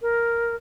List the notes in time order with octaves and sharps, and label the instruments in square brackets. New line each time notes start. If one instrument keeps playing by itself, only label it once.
[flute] A#4